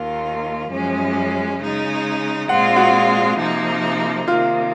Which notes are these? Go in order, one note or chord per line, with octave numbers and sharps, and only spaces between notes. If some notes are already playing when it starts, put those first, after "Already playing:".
Already playing: D#2 D#3 A#3 F4
F#2 F3 G#3 C#4
C#3 G#3 D#4
A#2 G#3 C4 F4 F#5
F#4 F#5
C3 F3 A#3 D#4
C3 D#3 A#3 F4 F5